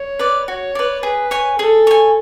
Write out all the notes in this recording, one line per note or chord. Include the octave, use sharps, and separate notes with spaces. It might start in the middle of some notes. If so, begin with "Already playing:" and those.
Already playing: C#5
B4 D5
F#4 C#5
B4 D5
G#4 B4
C#5 G#5
G#4 A4
C#5 G#5